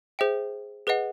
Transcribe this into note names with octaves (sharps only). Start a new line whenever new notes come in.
G#4 C5 E5 G5
G#4 B4 D#5 F#5